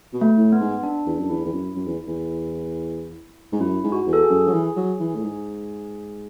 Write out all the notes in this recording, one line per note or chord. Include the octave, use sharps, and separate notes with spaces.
B2
A3
A2
B3
G#2
D4
E2
F#2
E2 E4
E2
F#2
F#2
E2
E2
G#2
F#2 E4
G#2
F#4
E2
A4
G#4
F#2
F#3
E3
F#3
E3
A2
G#2